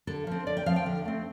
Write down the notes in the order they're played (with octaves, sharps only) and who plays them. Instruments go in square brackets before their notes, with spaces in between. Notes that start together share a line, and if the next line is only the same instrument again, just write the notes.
[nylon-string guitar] D3 A4
F3 C4
D3 D5
G5
F3 C4 F5
G5
D3
A3 C4